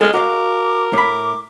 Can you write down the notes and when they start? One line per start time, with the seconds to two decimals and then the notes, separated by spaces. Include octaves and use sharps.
0.01 G#3 A4 D#5 F6
0.14 F#4 A#4 D#5 F5 D6
0.93 A2 B5 D6